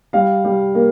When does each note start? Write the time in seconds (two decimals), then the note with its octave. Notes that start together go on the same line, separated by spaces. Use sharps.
0.13 G3 F5
0.45 G3
0.75 A#3